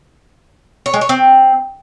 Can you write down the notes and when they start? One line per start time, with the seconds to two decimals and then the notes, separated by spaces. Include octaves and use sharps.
0.86 C#5
0.94 G#3
1.01 C#5
1.09 C4